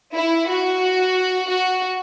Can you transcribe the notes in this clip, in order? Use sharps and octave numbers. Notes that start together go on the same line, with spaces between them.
E4
F#4
F#4